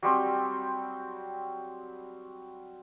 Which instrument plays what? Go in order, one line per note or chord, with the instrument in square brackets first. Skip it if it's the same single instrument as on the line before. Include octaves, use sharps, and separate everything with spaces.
[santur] F#3 G3 C4